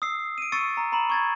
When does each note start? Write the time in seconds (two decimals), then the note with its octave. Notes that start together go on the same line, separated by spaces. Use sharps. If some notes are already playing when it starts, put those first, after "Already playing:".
0.02 D#6 E6 C7
0.38 D7 D#7
0.52 C#6 E6 A6 C#7 D#7
0.77 A#5
0.92 A#5 B5 E7 F#7
1.10 C#6 G#6 A6